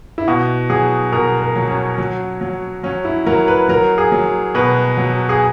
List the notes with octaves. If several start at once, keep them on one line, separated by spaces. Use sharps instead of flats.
E4
B2 F#4
F#3 G#4
B2 A#4
A#4
F#3
C#4
F#3
F#3
F#3 C#4
E4
F#3 A#4
B4
F#3 A#4
G#4
F#3
B2 B4
F#3
G#4